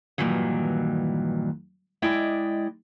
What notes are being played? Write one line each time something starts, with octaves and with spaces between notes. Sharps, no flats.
G2 A#2 D#3 E3 F#3
G#3 E4 D5 D#5 G5